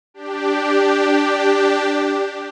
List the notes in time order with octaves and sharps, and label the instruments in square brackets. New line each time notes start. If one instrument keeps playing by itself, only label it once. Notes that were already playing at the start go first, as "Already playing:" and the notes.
[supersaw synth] D4 G4